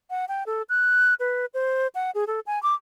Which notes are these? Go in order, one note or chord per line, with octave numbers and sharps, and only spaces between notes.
F#5
G5
A4
F#6
B4
C5
F#5
G#4
A4
G#5
D6